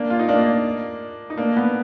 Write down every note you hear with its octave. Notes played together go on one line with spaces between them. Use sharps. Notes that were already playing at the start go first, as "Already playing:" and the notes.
Already playing: A#3 D4
F4
D#4
A#3 D4
D#4
A#3 D4
B3